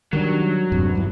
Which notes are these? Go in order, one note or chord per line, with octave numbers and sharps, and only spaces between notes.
D#3 F#3 G3 D4
E2 G2 C3
G2 E3